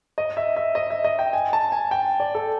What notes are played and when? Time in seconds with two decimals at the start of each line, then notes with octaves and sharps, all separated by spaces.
0.18 D#5
0.37 E5
0.57 E5
0.75 D#5
0.90 E5
1.04 D#5
1.19 G5
1.33 G#5
1.53 A5
1.72 G#5
1.91 G5
2.20 D5
2.35 A4